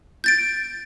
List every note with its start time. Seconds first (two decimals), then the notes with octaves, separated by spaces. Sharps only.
0.24 G6 A6 D7